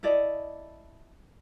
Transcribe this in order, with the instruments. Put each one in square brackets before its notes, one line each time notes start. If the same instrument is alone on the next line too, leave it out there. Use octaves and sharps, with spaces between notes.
[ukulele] E4 A4 D5 D#5